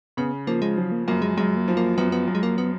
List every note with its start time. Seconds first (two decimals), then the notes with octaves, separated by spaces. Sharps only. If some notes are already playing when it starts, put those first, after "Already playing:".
0.17 C#3 B3
0.47 F3 A#3
0.62 G#3
0.77 F3 F#3
0.92 A#3
1.08 F#2 A#3
1.22 G#3
1.38 F#2 G#3
1.57 A#3
1.68 F3
1.77 A#3
1.98 F#2 B3
2.12 B3
2.28 F#2
2.35 G#3
2.43 A#3
2.58 B3